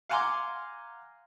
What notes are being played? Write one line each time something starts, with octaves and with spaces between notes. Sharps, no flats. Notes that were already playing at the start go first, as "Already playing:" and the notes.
F5 F#5 G#5 A#5 C6 D6